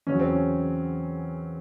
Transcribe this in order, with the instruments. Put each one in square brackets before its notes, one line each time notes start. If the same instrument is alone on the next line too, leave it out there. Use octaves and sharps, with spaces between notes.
[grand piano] E2 C#3 F#3 C#4
C4
C#4